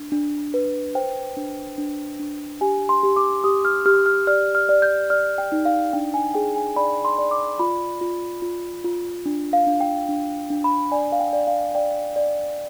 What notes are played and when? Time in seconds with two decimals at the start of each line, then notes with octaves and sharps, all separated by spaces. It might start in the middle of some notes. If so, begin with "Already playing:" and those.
Already playing: D4
0.12 D4
0.54 B4
0.95 C5 G5
1.37 D4
1.78 D4
2.20 D4
2.61 G4 G#5
2.89 C6
3.03 G4
3.16 D6
3.44 G4 D#6
3.65 F6
3.86 G4 F6
4.06 F6
4.27 D5 F6
4.55 F6
4.69 D5
4.82 G6
5.10 D5 F6
5.38 G5
5.52 D#4
5.65 F5
5.93 D4 G5
6.14 G#5
6.34 G#4 G5
6.56 G#5
6.76 D5 B5
7.05 C6
7.18 D5
7.31 D6
7.59 F4 B5
8.01 F4
8.42 F4
8.84 F4
9.26 D4
9.53 F5
9.67 D4
9.80 G5
10.09 D4
10.50 D4
10.64 B5
10.92 D5 G#5
11.12 F5
11.20 G5
11.33 D5
11.47 F5
11.75 D5 G5
12.16 D5